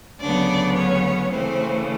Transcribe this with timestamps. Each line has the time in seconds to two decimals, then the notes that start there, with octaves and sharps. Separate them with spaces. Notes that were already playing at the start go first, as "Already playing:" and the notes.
0.20 D2 C#3 F#3 B3 D4 D5
0.76 C#4 C#5
1.31 C#3 E3 A3 C4 C5